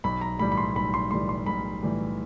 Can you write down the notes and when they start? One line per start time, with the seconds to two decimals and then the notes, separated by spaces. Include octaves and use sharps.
0.04 B1 B5
0.21 A#5
0.39 A2 E3 G3 B5
0.52 B5
0.57 C6
0.76 B1 B5
0.94 C6
1.11 A2 E3 G3 C6
1.29 C6
1.46 B1 B5
1.83 A2 E3 G3